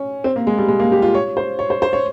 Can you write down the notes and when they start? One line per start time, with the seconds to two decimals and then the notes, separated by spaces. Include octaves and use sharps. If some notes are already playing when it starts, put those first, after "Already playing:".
Already playing: C#4
0.24 C4
0.36 A#3
0.47 G#3
0.58 G3
0.68 G#3
0.80 A#3
0.92 G4
1.02 F4
1.15 C#5
1.37 C5
1.59 C#5
1.70 C5
1.82 C5
1.93 C#5